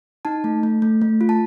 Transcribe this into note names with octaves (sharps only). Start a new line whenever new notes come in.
D#4 A5
A3
A3
A3
A3
F4
A5